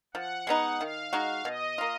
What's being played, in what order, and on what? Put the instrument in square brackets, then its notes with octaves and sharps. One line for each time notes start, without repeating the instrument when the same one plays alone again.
[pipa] F3 [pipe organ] F#5
[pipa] G#3 B3 D#4
[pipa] D#3 [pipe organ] F5
[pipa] G#3 D#4 F#4
[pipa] B2 [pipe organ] D#5
[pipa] A#3 F4